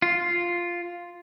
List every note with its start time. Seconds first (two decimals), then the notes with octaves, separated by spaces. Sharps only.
0.02 F4